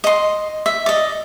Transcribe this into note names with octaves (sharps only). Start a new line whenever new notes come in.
D#5 C6
E5
D5 D#5